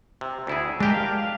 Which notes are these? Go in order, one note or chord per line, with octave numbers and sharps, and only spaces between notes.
C3
D2 E4 G#4
G#3 D4 G4 A#4
F5